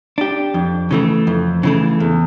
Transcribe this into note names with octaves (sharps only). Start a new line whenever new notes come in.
D4 G4
F2
C#3 E3 A3
F2
C#3 E3 A3
E2